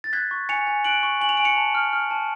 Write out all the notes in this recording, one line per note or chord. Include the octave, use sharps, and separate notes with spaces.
A6
F#6 G#6 B6
C#6
G#5 C#7 F7
G#5
F#6 D7 F#7
C#6
G#5 F#7
F7
G#5 D7
C#7 F7
A5
F6
F6
A5